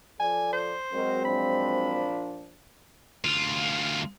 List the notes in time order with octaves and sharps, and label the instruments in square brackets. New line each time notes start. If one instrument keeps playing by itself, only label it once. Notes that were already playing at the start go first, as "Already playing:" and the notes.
[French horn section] F3 A4 D5 [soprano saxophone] G#5
[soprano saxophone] C5
[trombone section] F#3 G#3 C4 [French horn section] F#4 A#4 D#5
[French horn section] A#2 F3 D4 [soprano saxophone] B5
[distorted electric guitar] D2 F4